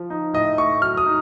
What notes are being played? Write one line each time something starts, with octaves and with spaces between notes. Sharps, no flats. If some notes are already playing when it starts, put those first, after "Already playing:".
Already playing: F3
D#4
A2 D#5
A3 C#6
F#3 F6
D#6
D#4